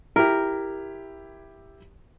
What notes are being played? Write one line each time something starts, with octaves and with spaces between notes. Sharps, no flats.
E4 G4 A#4